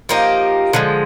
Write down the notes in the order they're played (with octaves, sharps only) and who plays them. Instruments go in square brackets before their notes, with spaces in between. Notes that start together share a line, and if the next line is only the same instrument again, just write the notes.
[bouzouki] F3 A#3 D#4 G4
D3 F3 G#3